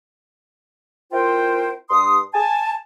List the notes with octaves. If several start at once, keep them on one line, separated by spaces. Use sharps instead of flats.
C4 E4 F4 A#4 C5 G5
G2 C6 D#6
G#5 A5